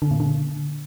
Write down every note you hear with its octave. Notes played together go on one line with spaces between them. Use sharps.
D3
A#2
D3